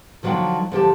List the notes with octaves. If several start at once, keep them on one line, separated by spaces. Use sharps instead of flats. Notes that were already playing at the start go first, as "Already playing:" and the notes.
D3 F3 F#3 D4 D#4 G5
D3 F3 G4 A5